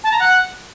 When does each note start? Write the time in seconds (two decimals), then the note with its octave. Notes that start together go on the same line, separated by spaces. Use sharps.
0.04 A5
0.12 A#5
0.20 F#5